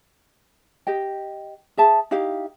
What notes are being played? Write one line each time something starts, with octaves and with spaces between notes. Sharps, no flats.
G4 D#5 G5
G#4 E5 A5
D#4 E4 G4 F5